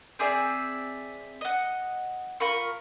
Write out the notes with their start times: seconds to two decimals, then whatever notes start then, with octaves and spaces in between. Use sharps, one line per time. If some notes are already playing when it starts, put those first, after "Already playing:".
0.19 C4 G#4 D5 E5
1.41 D#5 F#5
2.40 F4 A#4 B5 C#6